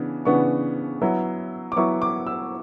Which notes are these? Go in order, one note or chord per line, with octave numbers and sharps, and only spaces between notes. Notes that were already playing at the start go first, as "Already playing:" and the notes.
Already playing: C#3 E3 B3 D4
C#3 E3 B3 D4 C#6
F#3 B3 E4
D6
F#3 B3 E4 C#6
D6
E6